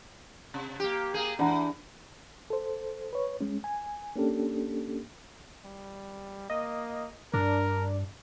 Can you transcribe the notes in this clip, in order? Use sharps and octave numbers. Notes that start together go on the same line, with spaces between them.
C3
A#3 G4
A#3 G#4
E3 D4 F#5 A#5
A4 C5
B4 C#5
G#3 C#4
G#5
A#3 C#4 D4 G4 A4
G3
A#3 D#5
G2 D4 A#4